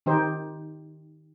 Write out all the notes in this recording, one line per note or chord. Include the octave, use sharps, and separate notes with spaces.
D#3 D#4 G4 C5